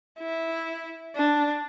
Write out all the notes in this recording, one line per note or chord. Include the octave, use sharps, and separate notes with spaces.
E4
D4